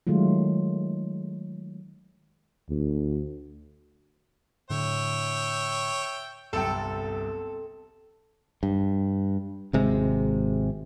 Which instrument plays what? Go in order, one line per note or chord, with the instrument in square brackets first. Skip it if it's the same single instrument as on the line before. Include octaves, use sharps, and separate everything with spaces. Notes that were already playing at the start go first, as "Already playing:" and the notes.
[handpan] D#3 F#3 G#3 A3 F4
[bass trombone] D2
[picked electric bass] A2 D3 [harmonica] C#5 E5 G5
[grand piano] G1 C2 [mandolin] C4 G5 [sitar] A4
[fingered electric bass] G2
G#1 C3 G#3